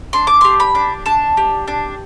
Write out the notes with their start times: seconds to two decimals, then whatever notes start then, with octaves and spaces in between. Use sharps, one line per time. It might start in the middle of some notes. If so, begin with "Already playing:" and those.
0.13 D4 C6
0.27 D6
0.41 G4 C6
0.60 B5
0.75 D4
1.06 D4 A5
1.37 G4
1.68 D4